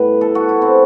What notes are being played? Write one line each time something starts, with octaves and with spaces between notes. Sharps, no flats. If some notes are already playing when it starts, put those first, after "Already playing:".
Already playing: A2 G3 B3 B4
A4
F#4
E4
C4